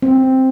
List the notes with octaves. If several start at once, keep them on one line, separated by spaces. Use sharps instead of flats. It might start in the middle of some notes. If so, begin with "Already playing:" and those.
C4